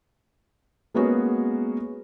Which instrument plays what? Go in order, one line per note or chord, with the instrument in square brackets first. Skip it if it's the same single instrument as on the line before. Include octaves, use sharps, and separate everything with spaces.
[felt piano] G#3 A#3 B3 C#4 F#4 G#4